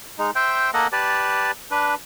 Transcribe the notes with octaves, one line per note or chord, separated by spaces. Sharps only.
G#3 D#4
C5 E5 G5
A#3 A4 D#5 F#5
G4 B4 D5 A5
D4 B4